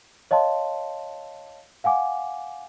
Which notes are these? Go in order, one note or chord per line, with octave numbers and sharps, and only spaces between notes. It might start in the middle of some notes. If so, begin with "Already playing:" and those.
C#5 D#5 F5 A5 C6
F5 F#5 G#5 D6